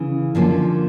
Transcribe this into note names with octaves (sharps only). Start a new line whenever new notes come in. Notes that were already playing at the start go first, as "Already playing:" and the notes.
Already playing: C#3 E3
D3 F3 A#3 C#4